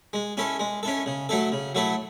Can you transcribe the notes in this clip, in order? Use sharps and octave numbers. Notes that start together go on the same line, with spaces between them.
G#3
C#4 E4 A4
G#3
C#4 E4 A4
C#3
F#3 A3 E4 A4
C#3
F#3 A3 E4 A4